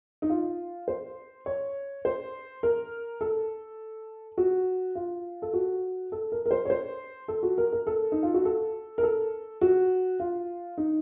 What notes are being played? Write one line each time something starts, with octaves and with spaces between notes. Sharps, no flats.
D#4
F4
C5
C#5
C5
A#4
A4
F#4
F4
A4
F#4
A4
A#4
A#4
C5
C#5
C5
A4
F#4
A#4
A#4
A4
D#4
F4
F#4
A4
A#4
A4
F#4
F4
D#4